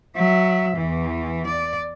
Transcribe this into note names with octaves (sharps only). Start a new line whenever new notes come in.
F#3 E5
E2 E3
D5